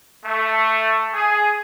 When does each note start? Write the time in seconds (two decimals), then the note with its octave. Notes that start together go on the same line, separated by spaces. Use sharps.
0.25 A3
1.12 G#4